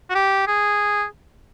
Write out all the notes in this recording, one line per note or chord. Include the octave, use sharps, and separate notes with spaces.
F#4
G4
G#4